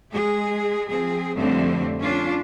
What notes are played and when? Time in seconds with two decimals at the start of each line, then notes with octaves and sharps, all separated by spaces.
0.11 G#3 G#4
0.88 F3 C4 G#4
1.37 F2 A2 D3 G3 A3 C4
2.00 C#4 D4 F4